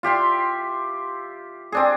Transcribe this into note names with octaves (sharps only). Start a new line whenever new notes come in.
F4 G4 E5 C6
C4 D4 G#4